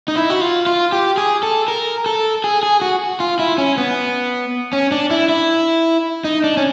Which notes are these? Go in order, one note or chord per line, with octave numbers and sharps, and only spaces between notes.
D#4
E4
F#4
F4
F4
G4
G#4
A4
A#4
A4
G#4
G#4
F#4
F4
E4
C#4
B3
C#4
D4
E4
E4
D#4
D4
C#4